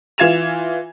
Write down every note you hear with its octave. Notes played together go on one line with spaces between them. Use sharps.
E3 F4 G#6 E7 F7